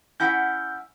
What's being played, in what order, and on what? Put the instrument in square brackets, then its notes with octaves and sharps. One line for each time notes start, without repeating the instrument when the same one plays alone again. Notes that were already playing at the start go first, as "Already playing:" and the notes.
[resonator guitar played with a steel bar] C#4 E4 F#5 [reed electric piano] G6